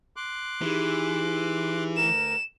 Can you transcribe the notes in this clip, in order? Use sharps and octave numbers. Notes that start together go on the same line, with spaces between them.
C6 D6 F#6
E3 D#4 G4 G#4
D2 A#4 E7